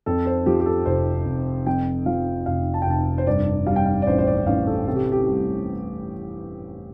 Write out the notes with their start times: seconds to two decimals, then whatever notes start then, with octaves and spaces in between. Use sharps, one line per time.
0.06 F2 A4
0.26 C5
0.46 F3 G4
0.60 G4
0.66 A4
0.86 F1 C5
1.26 F1
1.66 F2 G5
2.06 F3 F5
2.46 F1 F5
2.74 A5
2.82 G5
2.86 F1 A5
3.18 C5
3.27 G2 D5
3.67 G3 F5
3.76 G5
3.85 F5
4.02 D5
4.07 A1 C5
4.18 C5
4.27 D5
4.47 A1 F5
4.67 A4
4.87 C3 A4
4.95 G4
5.12 G4
5.27 G3